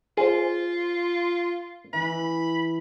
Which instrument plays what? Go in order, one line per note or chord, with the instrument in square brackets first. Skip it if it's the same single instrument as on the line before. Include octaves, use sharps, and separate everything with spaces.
[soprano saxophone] F4 [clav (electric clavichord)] G#4 C5
[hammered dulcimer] E3 [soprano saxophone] B5